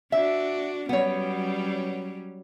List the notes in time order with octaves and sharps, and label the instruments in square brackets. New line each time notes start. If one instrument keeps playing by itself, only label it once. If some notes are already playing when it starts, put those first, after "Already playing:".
[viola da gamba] D4 F#4 [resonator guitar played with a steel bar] E5
[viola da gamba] F#3 G3 C#4 [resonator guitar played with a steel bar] B3 C#5